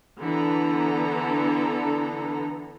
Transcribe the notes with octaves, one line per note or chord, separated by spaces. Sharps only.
D3 E3 B3 A4 A#5